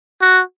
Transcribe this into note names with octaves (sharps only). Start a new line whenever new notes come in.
F#4